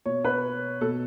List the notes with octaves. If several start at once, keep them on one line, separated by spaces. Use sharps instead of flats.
B2 C#5
B4
B2 A4